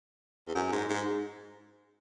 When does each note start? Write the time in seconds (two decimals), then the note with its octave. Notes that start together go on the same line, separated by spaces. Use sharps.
0.47 E2
0.55 F#2
0.72 G#2
0.90 G#2